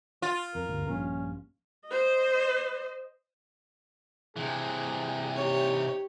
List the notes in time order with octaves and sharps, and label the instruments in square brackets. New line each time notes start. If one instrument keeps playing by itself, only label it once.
[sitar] F4
[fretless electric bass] F2 [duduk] A#4
[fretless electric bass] G1 D2 G2
[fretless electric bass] A#1 G2 A#2 [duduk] C#4
[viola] C5 D#5
[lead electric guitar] C3 E3 [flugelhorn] G#4
[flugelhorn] D#4 [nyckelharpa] G4 C#5